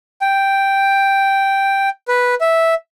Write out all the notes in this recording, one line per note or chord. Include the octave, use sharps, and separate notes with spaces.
G5
B4
E5